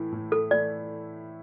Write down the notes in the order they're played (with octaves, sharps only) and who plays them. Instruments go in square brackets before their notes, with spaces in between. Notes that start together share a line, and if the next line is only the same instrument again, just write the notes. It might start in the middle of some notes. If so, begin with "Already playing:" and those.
Already playing: [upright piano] A2 E3 A3 E4
A2
[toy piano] A4
[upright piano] E3 A3 E4 [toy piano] D5